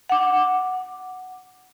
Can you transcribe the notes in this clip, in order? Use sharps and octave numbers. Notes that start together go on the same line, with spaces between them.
F#5 D6